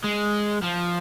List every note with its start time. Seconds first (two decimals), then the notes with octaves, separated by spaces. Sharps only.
0.04 G#3
0.63 F3